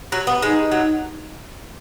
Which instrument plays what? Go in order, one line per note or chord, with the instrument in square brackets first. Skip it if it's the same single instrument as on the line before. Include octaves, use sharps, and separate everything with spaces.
[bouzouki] F#3
B3
[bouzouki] G#3 [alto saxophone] D#4
[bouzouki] F#3